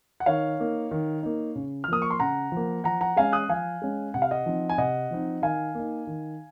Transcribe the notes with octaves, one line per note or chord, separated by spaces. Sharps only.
F#5
D#3 C#5 F5
A#3 D#4
D#3
A#3 D#4
C#3
F6
F3 A#3 D#6
C#6
C6
C#3 F#5 A#5
F3 A#3
F3 F#5 A#5
F#5 A#5
G#3 C#4 F5 G#5
D#6 F#6
F3 F5 G#5
G#3 C#4
C3 F#5
F5
D#5 F#5
F3 C4 D#4
G#5
C3 D#5 F#5
F3 C4 D#4
D#3 F5 G#5
A#3 D#4
D#3